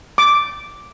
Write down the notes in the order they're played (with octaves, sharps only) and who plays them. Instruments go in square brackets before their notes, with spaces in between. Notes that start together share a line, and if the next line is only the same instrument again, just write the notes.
[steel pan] D6